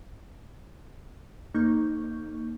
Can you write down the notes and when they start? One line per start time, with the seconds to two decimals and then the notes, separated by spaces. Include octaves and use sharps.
1.54 F2 A#3 D#4 C#6 G6